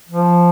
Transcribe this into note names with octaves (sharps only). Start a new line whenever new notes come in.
F3